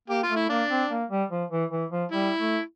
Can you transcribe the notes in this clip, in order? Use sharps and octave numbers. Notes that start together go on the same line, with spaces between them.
A#3 G4
F4
A3
E4
A#3 D4
C4
A#3
G3
F3
E3
E3
F3
G3 E4
A3